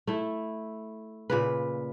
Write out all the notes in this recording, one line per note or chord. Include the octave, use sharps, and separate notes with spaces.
A3 E4
A#2 C#3 B4